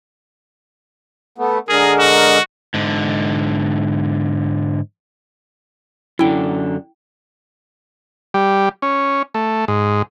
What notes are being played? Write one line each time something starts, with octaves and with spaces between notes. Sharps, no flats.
A3 B3
D3 G#3 G#4 A#4
F#4
G#2 D3
F#2 D3 E4 G5
G3
C#4
A3
G#2